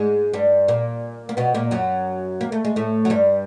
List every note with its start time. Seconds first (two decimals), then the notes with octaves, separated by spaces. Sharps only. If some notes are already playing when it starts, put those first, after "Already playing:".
Already playing: G#2 G#3
0.34 G2 G3
0.68 A#2 A#3
1.29 A#3
1.37 B2 B3
1.54 A#2 A#3
1.71 F#2 F#3
2.41 A#3
2.52 A3
2.65 G#3
2.76 A2 A3
3.05 F#3
3.10 G2 G3